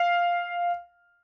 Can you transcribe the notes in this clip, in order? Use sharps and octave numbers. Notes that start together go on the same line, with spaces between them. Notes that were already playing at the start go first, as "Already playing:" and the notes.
Already playing: F5